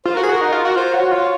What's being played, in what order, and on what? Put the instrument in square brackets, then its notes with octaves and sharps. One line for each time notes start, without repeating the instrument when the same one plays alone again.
[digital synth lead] F4 [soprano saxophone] C5
[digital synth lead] F#4 [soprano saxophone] A#4
[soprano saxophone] G#4
[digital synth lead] F#4 [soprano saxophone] A#4
[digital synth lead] D#4
F4
F#4
[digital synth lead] F4 [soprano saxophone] C5
[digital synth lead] F#4 [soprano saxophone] C#5
[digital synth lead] F4